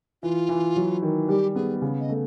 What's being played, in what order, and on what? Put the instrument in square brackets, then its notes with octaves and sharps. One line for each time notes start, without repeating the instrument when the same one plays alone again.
[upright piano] E3 [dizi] F4
[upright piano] E3
F#3
D#3
[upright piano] G3 [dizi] G4
[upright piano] B3 [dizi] G#4
[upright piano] C#3
[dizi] D#5
[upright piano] A3